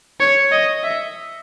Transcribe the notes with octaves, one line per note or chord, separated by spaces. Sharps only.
C#5
D#5
E5